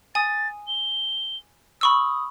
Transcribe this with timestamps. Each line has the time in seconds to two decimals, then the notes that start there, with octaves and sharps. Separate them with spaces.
0.15 G#5 D#6 A6
0.68 G7
1.81 B5 C#6 D#6 E6